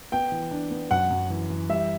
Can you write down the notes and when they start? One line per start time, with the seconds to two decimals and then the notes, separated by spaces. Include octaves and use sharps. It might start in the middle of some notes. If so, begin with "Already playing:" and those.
0.12 B3 G5
0.32 E3
0.51 D4
0.71 B3
0.91 F#2 F#5
1.10 F#2
1.30 E3
1.50 E3
1.69 G3 E5